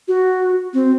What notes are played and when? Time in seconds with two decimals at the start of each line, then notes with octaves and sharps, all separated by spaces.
0.08 F#4
0.74 C4